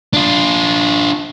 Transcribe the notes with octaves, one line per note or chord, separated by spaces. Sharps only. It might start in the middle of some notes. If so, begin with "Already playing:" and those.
D4 F4